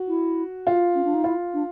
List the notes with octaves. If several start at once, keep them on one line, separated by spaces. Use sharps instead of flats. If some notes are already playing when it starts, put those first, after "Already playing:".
Already playing: F#4
E4
F4
C#4
D4
D#4
E4 F4
D4